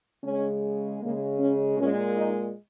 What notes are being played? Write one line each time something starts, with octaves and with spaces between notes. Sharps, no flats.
C#3 G#3 C#4
C#3 G#3 A#3
C#4
A#2 G#3 C#4
D#4